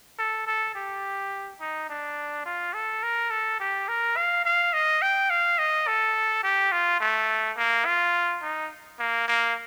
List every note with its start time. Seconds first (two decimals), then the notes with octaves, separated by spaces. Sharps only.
0.18 A4
0.47 A4
0.75 G4
1.60 D#4
1.89 D4
2.45 F4
2.74 A4
3.03 A#4
3.31 A4
3.60 G4
3.88 A#4
4.16 F5
4.45 F5
4.73 D#5
5.02 G5
5.30 F5
5.58 D#5
5.87 A4
6.43 G4
6.72 F4
7.00 A3
7.57 A#3
7.85 F4
8.42 D#4
8.99 A#3
9.28 A#3